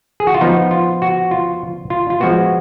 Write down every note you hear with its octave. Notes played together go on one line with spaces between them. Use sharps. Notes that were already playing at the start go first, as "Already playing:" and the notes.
G#4
F#4
F4
F3 B3 D#4
F4
F#4
F4
F4
F4
F3 G#3 B3 F#4